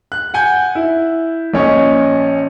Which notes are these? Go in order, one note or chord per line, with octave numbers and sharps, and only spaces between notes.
F#6
F#5 G#5 G6
E4
A#1 C#4 D#5